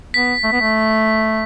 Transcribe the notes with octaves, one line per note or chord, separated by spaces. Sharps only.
B3 B6
A3
B3
A3